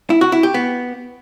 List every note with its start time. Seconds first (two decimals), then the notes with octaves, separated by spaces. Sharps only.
0.10 E4
0.21 F#4
0.32 E4
0.43 G4
0.54 B3